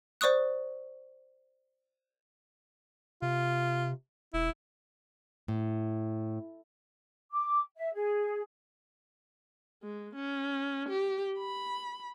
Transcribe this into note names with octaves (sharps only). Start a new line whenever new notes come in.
C5 D5 C#6 D#6 F#6
C3 F4
E1 E4
A2
D6
E5
G#4
G#3
C#4
G4
B5